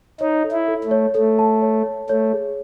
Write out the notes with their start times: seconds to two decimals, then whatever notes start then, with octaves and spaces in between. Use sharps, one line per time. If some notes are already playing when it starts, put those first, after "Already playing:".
0.21 D#4 C#5
0.44 A4
0.52 E4
0.68 A4
0.84 A3
0.91 C#5
1.15 A3 A4
1.39 A5
1.62 C#5
1.86 C#5
2.09 A3 C#5
2.33 G#4